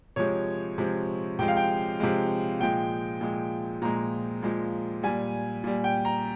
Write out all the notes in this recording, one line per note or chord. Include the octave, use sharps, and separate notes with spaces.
C3 F3 G#3 C#5
C3 F3 G#3
C3 F3 G#3 G5
F5
G5
C3 F3 G#3
A#2 F3 G#3 G5
A#2 F3 G#3
A#2 F3 G#3 A#5
A#2 F3 G#3
A#2 G3 G#5
A#2 G3
G5
A#5